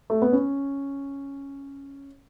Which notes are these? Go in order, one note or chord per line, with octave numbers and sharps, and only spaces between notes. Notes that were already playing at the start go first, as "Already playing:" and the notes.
A3
B3
C#4